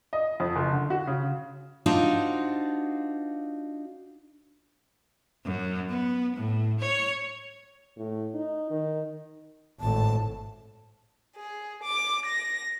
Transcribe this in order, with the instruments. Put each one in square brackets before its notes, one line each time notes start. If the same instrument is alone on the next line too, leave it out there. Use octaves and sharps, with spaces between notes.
[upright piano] D#5
F2
F#1
D3
F#4
C#3
[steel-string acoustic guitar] D4 D#4 F4 F#4 C5
[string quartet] F#2
B3
A2
C#5
[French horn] A2
D#4
D#3
[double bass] G#1 A2 [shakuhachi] A5
[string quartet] G#4
D6
A#6